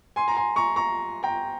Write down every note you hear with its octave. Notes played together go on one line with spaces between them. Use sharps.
G#5 C6
A#5
G#5 C6
A#5 C#6
A#5 C#6
G5 A#5